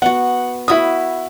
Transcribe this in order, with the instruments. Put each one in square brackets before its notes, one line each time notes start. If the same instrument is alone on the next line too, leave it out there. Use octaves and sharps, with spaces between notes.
[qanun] B3 F#4 [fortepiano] F#5
[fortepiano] E4 D#6 [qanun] F#4 B5